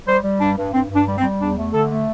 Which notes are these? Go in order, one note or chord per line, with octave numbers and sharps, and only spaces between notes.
G3 C5
G3
G2 D4
G2
G2 C4
G2 D4
G3
C4
G3
E2 D4
A3
D3 A4
A3